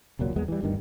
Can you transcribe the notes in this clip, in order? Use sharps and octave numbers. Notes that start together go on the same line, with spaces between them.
E1 C#2 A#2 F#3
E2 G#3 B3
E3 G3
G1 D2 G2 D#3